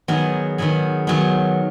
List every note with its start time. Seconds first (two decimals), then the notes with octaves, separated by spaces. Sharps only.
0.08 D#3 F#3 B3 G#4
0.58 D#3 F#3 B3 G#4
1.07 D#3 F#3 B3 G#4